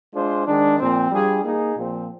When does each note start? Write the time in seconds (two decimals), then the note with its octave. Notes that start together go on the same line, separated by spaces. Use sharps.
0.13 G#3 D4 F4 G#4 C5
0.46 D#3 G#3 D4
0.79 A#2 F3 C4
1.11 G3 D4 F4 G#4
1.43 A#3 D#4 G#4
1.75 A#2 F3 C4